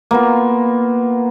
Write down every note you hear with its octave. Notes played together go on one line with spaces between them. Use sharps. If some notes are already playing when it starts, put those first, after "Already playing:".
A#3 B3 F4